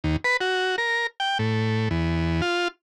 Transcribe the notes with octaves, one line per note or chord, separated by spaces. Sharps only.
D#2
B4
F#4
A#4
G5
A2
E2
F4